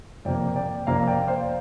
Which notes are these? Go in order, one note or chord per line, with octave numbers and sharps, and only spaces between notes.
F2 C3 A#3 D5 G5
D5 G5
F2 C3 A#3 F5 A#5
D5 G5
C5 F5